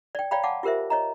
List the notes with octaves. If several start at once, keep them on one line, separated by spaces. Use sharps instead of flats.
D5 G5
C#5 D5 F5 G5 A#5 B5
F5 F#5 A5 D6
F4 G4 A#4 C5 E5
C#5 D#5 A#5